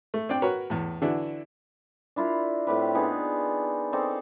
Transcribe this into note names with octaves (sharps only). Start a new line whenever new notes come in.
A3
C4 D4 D5 G5
F#4 A#4 B4 C#5
E2 A2
D3 E3 D4 E4 F#4
D4 E4 F4 A#4
A2 C4 G4 B4
B3 D4 D#4 G#4
C4 D#4 A4 D5